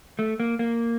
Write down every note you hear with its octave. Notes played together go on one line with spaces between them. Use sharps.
A3
A#3
A#3